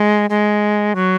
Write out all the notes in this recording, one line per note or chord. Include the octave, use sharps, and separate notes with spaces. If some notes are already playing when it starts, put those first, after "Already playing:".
Already playing: G#3
G#3
F#3